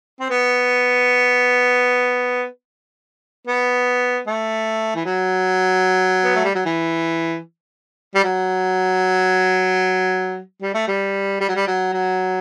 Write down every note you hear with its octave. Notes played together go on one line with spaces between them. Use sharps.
C4
B3
B3
A3
E3
F#3
B3
A3
G3
F#3
E3
G3
F#3
G3
A3
G3
G3
F#3
G3
F#3
F#3